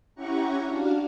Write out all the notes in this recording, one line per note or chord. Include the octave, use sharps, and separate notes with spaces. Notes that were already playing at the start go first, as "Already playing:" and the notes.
C#4 E4 G4 F#5 A#5 C#6
D4 F#4 F5